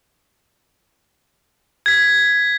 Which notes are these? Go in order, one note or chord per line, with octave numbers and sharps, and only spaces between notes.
G#6 B6